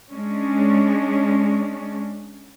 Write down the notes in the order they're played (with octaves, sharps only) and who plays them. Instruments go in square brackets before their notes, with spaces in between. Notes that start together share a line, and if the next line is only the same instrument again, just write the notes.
[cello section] G#3 C#4 D4